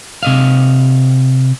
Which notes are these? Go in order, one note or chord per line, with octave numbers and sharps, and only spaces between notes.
C3 D#5 F5